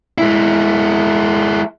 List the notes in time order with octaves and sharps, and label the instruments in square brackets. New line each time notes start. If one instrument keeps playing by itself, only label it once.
[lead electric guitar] G#3 E4